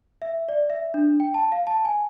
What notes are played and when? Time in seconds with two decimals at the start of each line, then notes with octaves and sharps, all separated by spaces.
0.22 E5
0.49 D5
0.70 E5
0.94 D4
1.20 G5
1.34 A5
1.52 F5
1.67 A5
1.85 G#5